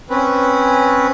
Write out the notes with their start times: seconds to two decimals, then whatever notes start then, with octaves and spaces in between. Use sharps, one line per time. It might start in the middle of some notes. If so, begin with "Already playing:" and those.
0.10 C4 C#4 B4